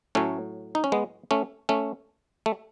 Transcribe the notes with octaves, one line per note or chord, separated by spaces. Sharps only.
A2 F#3 A3 C#4
D#4
C#4
G#3 B3
A3 C#4
A3 C#4
A3